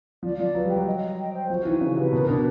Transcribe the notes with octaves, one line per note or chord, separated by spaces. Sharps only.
F3 D5
F3 D5
F#3 B4
G3
G5
F#3
D#5
D#5
G5
C5
F3 F#4
E3 D#4
C#3 F#4
C3 B4
B2 A#4
B2 D4